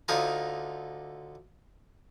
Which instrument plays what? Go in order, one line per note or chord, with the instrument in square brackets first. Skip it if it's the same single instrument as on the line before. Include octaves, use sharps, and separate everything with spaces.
[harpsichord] D2 D3 D#4 F4 G#5 A#5